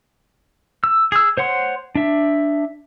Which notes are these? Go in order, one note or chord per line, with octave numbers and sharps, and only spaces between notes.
E6
G#4 E6
C5 C#5 F#5 C6
D4 E5